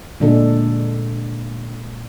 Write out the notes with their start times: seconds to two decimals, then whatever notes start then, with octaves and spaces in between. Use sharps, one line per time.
0.20 A#2 D3 G#3 D4 A4